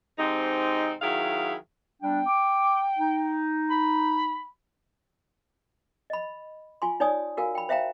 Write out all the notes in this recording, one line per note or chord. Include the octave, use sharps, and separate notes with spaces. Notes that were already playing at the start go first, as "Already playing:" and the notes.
G#2 C3 C4 D#4
D#3 F#3 E4 G#4 F5
G3 B3 D4 G5
D6
D#4
B5
D#5 B5
F4 G#5 C6
D#4 C#5 D5 G#5 D#6
F#4 A#4 F5 G#5
G5 B5
C5 E5 F5 G5 A#5